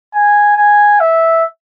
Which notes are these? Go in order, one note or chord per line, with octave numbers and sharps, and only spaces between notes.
G#5
G#5
E5